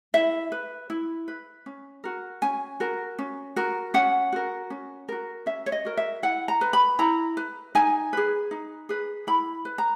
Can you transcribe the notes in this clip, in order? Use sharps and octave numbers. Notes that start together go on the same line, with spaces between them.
E4 E5
B4
E4
B4
C#4
F#4 A#4
C#4 G#5
F#4 A#4
C#4
F#4 A#4
C#4 F#5
F#4 A#4
C#4
F#4 A#4
C#4 E5
C#5
D#5
F#4 A#4
E5
E4 F#5
A#5
B4
B5
E4 A#5
B4
D#4 G#5
G#4 B4
D#4
G#4 B4
E4 B5
B4
A#5